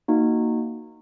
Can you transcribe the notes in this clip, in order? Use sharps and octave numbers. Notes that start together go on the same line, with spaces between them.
A#3 D#4 F#4